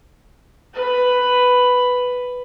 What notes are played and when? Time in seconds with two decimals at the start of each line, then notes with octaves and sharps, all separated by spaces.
0.74 B4 B5